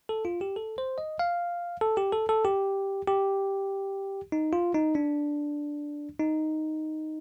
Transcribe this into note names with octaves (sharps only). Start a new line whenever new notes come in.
A4
F4
G4
A4
C5
D#5
F5
A4
G4
A4
A4
G4
G4
D#4
F4
D#4
D4
D#4